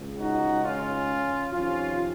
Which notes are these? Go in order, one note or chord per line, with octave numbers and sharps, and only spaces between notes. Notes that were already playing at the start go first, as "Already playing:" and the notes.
Already playing: C#2 C#3
D#4 F#4
C#4 F4
F2 C3 D#3 C#4 F4